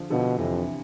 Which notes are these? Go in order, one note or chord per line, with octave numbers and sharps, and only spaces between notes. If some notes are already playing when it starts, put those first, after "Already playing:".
Already playing: D3 F3
B2 D3 F3
F2 C3 E3